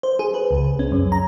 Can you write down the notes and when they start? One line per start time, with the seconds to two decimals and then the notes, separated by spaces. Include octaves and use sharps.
0.03 C5
0.19 G#4
0.34 B4
0.51 C#2
0.79 C#4
0.92 F#2
1.12 A#5